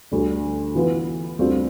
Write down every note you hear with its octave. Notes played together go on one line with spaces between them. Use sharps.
D2 D3 G3
E3 B3 F4
D2 D3 G3 C4 F4